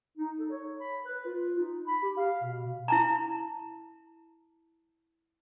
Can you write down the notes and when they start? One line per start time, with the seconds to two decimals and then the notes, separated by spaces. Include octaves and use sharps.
0.18 D#4
0.39 A4
0.51 C#5
0.80 B5
1.05 B4
1.26 F4
1.59 D#4
1.87 B5
2.03 G4
2.17 F5
2.43 B2
2.88 E4 A5 A#5